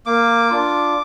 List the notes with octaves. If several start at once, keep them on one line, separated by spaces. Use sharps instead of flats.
A#3 D6
D4 F4